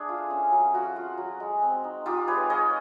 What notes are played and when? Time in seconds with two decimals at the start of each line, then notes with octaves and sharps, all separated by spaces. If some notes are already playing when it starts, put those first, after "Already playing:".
Already playing: A3 D4 G#4
0.09 F4
0.31 C#4
0.52 F#3
0.74 F4 F#4
0.96 F4
1.18 F#3
1.40 G#3
1.62 C4
1.84 D#4
2.06 D#4 F4 G4
2.27 G#3 B4 C#5
2.49 G#3 C#5 D#5